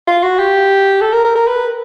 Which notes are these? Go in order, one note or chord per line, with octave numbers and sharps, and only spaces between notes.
F4
F#4
G4
A4
A#4
A#4
A#4
B4